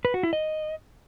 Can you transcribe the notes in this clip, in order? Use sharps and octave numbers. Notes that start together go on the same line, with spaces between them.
B4
F#4
E4
D#5